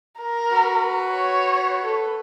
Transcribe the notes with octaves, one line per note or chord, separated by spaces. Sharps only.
A#4
F#4 B4
C#5
A4 B4